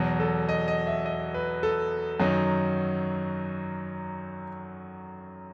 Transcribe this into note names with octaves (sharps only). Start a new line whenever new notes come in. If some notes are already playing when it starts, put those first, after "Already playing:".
Already playing: E2 B2 F#3
A4
D#5
D#5
E5
D#5
B4
A4
F#2 D#3 F#3 D#4